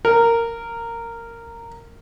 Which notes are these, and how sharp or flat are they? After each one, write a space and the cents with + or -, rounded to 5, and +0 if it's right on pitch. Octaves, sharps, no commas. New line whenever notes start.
A#4 -15